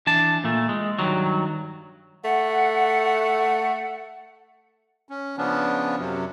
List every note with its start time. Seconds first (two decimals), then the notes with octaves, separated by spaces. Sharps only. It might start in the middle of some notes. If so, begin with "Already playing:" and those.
0.07 E3 D4 A5
0.44 A#2 A3
0.69 G#3
0.99 G2 B2 D#3 F#3
2.24 A3 F#5
5.09 C#4
5.37 C#3 F3 B3 C#4 D4
5.98 F#2 C3 F#3